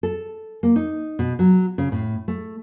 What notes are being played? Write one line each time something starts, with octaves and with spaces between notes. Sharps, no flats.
A4
A#3
D#4
B2
F#3
C#3
A2
A3